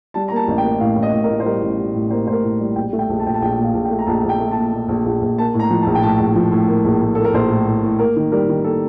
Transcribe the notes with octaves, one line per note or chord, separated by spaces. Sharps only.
G3 A5
A#5
A#3 A5
A1
G5
A#3
A2 F5
A1
D#5
A2
A#4
A2
C5
G3 A#4
A1
G3
A2
A#3 C5
A2 C5
A#4
A2
G3
A#1 G5
A3
G5
A#1
A5
A#1 G5
A5
A#1 G5
A#2
F5
A#1
G5
A3
A#5
A#1 A5
A#1
G5
A3
A5
A#2
A#2
A#1
A#1
A#1
A#3 A5
A2
A#5
F3
A5
A#1
G5
A2 A5
A#1
F3
A2
A#3
A#1
A2
A#3 A4
A#4
A#1 C5
A2
A2
A2
A#3 A#4
D#3
G3 A#4
D#3
A#3 A4